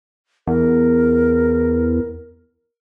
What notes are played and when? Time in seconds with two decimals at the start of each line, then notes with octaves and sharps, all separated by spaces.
0.47 E2 A#4